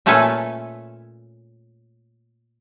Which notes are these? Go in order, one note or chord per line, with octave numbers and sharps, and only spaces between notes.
A#2 A3 C#4 A4 B4 G#5